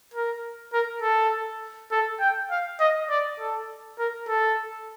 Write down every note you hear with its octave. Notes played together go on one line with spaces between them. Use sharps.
A#4
A#4
A4
A4
G5
F5
D#5
D5
A4
A#4
A4